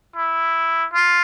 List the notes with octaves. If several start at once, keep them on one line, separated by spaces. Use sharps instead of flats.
E4
F4